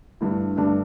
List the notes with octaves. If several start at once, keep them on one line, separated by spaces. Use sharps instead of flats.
G2 D3 A3 E4
G2 D3 A3 D4 A4